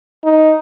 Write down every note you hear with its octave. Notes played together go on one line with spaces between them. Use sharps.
D#4